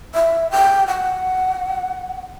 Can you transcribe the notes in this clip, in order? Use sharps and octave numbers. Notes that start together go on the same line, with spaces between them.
E5
G5
F#5